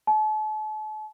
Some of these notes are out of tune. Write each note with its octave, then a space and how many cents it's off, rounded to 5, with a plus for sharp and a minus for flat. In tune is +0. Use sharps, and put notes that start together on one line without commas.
A5 -40